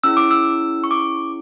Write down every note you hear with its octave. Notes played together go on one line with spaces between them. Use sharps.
C#4 E4 G#4 E6
D6
E6
C#6
D6